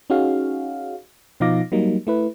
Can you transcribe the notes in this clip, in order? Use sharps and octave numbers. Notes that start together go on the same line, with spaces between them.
C#4 D#4 F#4 G#4 F5
B2 F3 D#4 F5 D6 A#6
F#3 G3 A#3 D#4
A3 E4 B4